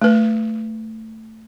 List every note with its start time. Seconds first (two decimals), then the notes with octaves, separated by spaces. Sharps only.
0.02 A3 B4